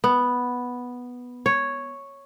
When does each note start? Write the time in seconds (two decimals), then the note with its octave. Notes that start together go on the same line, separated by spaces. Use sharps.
0.04 B3
1.46 C#5